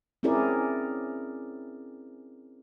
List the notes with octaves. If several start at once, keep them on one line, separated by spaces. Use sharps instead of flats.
C4 C#4 E4 G#4 A#4 D5